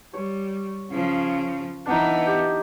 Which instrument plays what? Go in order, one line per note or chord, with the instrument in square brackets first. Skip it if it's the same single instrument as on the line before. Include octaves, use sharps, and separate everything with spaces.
[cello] G3 [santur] C#5
[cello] C#3 F3
[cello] E3 B3 [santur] D4 D#4
[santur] G4